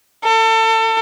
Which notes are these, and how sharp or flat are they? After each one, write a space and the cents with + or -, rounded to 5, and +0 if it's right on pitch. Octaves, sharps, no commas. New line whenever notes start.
A4 +30